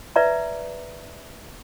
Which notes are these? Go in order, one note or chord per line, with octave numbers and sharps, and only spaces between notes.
B4 D5 E5 A#5